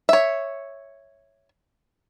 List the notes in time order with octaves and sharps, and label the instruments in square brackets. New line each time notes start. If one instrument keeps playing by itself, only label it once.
[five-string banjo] C#5 E5